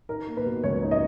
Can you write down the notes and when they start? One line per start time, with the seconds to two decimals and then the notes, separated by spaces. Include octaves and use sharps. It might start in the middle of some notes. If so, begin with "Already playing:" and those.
0.09 D#4 A#4
0.27 A#3
0.37 B4
0.46 B2
0.63 C#2 C#5
0.82 D#4
0.91 D#5